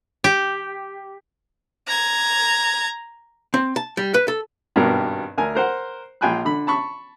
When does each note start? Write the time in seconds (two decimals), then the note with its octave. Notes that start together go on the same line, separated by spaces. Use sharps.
0.24 G4
1.87 A#5 G#6
3.54 C4
3.76 A5
3.97 G3
4.14 B4
4.28 A4
4.76 G#1 G2 B2 G3 G4 A#4
5.38 D2 A#4 G#5
5.55 A#4 C5 F#5
6.21 A#1 F4 G5 G#5 B5 F#6
6.45 D3 B5
6.67 A5 B5 C#6